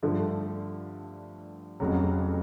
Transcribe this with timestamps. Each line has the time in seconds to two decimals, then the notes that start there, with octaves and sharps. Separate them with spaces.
0.03 G2 D3 F3 A3
1.80 F1 F2 C#3 F#3